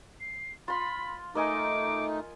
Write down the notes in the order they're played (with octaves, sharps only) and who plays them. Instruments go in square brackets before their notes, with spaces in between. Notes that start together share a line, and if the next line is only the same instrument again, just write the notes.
[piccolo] C7
[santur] F4 C6 [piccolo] B5
[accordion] A3 D#4 [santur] A#4 D#5 G#5 [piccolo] D6